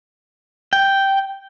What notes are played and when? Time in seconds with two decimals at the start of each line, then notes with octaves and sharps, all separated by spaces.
0.73 G5